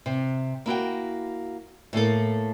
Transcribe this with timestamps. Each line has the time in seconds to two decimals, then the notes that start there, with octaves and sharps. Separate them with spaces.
0.06 C3
0.66 A#3 E4 F#4 G5
1.93 A2 A3 A#3 A4